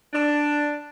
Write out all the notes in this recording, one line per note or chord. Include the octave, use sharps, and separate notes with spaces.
D4